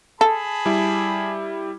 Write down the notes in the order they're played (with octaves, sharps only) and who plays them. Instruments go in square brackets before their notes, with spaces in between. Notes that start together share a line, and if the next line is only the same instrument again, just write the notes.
[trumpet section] G#4 A5 B5 [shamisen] A4
[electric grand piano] G3 E4